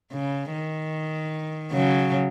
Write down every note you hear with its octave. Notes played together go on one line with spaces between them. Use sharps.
C#3
D#3
C#3 F#3